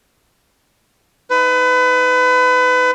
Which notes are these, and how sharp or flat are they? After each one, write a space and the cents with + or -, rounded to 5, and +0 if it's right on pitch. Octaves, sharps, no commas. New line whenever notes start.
D#4 +30 B4 +30